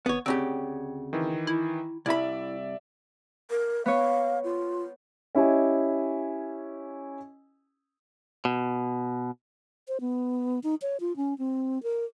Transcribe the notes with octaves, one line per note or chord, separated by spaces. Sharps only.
G#1 B3 C#5
D2 C#3 C4 G4
D#3 E3
E4
C2 E4 D5 E5 B5
A#4
B3 C#5 F5
F4
C#4 E4 G4 D#5 G#5
B2
C5
B3
D#4
C#5
F4
C#4
C4
A#4